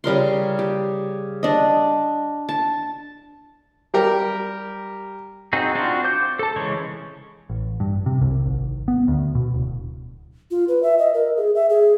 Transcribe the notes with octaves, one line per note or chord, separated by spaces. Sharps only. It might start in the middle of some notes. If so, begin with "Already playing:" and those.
C#3 G3 A#4 C6
G4
D4 D#5
A5
G3 G4 A#4
C4 D#4 F#4 G#4
C4 D4 F4 F#4
C5 D6 G6
A4 A5
C#3 E3 G#3 C#4 C#5
A1
G2
C3
C2
G#1
B3
D2
B2
D1
F4
B4
E5
D#5
A#4
G#4
E5
G#4